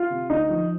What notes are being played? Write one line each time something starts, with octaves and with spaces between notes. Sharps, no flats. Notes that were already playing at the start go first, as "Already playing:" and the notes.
Already playing: F4
C3
D2 D#4
F3